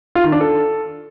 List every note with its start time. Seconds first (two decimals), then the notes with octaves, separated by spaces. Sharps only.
0.15 F4
0.24 D#3
0.32 D4
0.41 A4